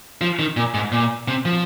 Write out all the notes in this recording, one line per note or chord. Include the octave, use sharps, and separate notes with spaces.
F3
D#3
A#2
G#2
A#2
C3
F3